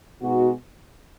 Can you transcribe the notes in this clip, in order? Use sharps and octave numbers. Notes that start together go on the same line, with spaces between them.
B2 G#3 D#4 F#4